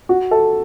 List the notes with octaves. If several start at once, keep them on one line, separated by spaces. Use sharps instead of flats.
F#4
A4